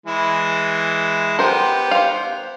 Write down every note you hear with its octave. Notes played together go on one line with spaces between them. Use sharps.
E3 G#3 E4
B3 G4 A#4 C5
C5 F5